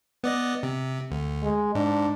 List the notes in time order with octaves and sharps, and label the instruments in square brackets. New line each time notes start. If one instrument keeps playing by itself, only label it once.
[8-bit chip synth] B3 D5 D#5
C3
D2
[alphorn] G#3
[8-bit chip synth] G#2 [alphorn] D4